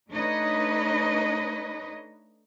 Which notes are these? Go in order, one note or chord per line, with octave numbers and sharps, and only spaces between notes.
A3 D4 D#4 B4 C#5 D#5